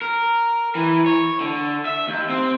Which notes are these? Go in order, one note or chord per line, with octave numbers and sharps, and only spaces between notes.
A#4
E3
C#5
D3
E5
D#2
C4